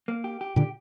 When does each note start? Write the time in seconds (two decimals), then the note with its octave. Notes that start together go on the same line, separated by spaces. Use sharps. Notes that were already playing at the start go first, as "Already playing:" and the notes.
0.08 A#3
0.24 G4
0.41 G4
0.56 A#2 D3 G4